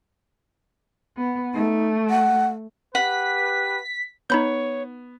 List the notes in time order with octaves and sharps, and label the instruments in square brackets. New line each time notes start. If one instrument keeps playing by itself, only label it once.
[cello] B3
[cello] A3 [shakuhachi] D#4
[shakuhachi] F#5
[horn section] G4 B4 [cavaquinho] F#5 [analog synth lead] B6
[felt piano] B3 [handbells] D#4 B5 G6 [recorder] C#5